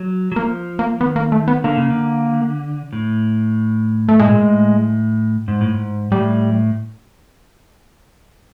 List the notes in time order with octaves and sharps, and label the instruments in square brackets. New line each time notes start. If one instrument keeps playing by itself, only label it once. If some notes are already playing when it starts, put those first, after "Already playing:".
Already playing: [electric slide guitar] F#3
F#3
[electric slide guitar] F3 [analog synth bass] A#3
[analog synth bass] A#3
[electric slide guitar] D#3 [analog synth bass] B3
[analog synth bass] A#3
A3
B3
[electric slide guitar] D3 [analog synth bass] A#3
[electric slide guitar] C#3
D3
A2
[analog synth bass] A3
[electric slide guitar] A2 [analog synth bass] G#3
[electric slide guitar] A#2
A2
G#2
A2
G#2
[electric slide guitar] A2 [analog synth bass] G3